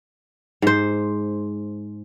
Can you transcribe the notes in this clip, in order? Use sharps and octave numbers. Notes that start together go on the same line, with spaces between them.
G#2 C5